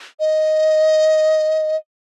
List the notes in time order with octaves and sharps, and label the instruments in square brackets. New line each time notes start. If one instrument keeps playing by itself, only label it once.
[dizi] D#5